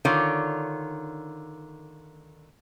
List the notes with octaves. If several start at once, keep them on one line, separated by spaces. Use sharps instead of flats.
D3 D#3 F4 C#5